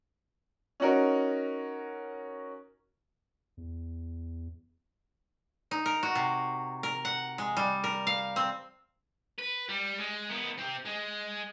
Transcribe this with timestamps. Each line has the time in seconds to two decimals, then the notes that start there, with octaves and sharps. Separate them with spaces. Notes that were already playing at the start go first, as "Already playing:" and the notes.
0.80 C#4 D#4 F#4 A#4
3.57 E2
5.71 D#4
5.86 A#4
6.03 F#4
6.15 C3
6.83 A#4
7.05 F#5
7.38 G#3
7.57 G3
7.84 A#4
8.07 F5
8.36 C4
9.38 B4
9.68 G3
9.99 G#3
10.30 D#3 B3
10.58 C4 G4
10.86 G#3